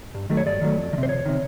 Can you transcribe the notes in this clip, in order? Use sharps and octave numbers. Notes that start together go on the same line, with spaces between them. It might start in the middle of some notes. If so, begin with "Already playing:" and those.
G2
D#3 F#3 A3
C#5
G2 D5
D#3 F#3 A3
F2
D#3
C3
C5
F2 C#5
C3 D#3